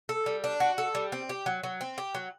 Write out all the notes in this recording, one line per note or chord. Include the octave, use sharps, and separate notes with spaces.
A4
G3
D4
F#4
A4
G3
C4
G4
F#3
F#3
C4
G4
F#3